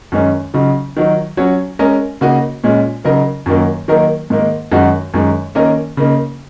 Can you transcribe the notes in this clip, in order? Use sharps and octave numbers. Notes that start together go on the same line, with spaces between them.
F#2 D#3 G#3 C#4
C#3 F#3 D#4
D#3 F#3 D#4
F#3 C#4 F#4 C#5
G#3 C#4 A#4 D#5
C#3 A#3 D#4 F#4 D#5
A#2 G#3 C#4
C#3 F#3 D#4 A#4 D#5
F#2 D#3 F#3 A#3
D#3 F#3 A#3 D#4 A#4
G#2 D#3 A#3 D#4
F#2 D#3 G#3 F#4
F#2 D#3 G#3
D#3 A#3 C#4 A#4 D#5
C#3 A#3 D#4